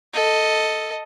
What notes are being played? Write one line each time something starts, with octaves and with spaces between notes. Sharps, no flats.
A4 D#5